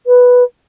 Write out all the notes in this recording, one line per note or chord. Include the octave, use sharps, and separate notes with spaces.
B4